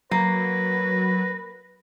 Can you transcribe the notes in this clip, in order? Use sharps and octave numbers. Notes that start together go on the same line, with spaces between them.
F#3 A#3 B4 A#6